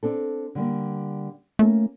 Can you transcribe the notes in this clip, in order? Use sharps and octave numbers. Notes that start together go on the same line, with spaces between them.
C4 D4 A4
D3 G3 A#3
A3 A#3 C#4 F4